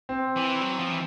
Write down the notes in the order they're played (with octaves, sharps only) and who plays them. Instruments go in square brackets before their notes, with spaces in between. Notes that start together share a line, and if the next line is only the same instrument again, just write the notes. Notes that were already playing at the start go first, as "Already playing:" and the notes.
[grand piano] C4
[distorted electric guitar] E3
F#3
F3
E3